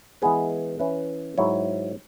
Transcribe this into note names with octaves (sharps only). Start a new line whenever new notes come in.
E3 G#3 B3 G#4 B4
E3 C#4 E4 B4
G#2 F#3 E4 C#5